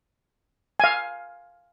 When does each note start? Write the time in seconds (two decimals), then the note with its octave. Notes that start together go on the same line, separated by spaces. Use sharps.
0.80 F5 G#5